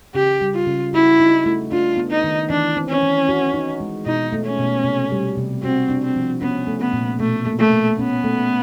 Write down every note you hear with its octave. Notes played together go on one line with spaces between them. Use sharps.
C#3 G4
G3
F4
C#3
E4 F#4
D#4
A3
D4 F4
B3
D#4
D#3
E3 D4
C4
C#4
E3
F#4
D#4
G#3
B2 D#4
A3
C#4
B2
C3
G3
C3
C4 F#4
D4
C4
F3
B3 C#4
A3
B3
A#2
B2 A3
A#3
A3
B2
B3 C#4
A3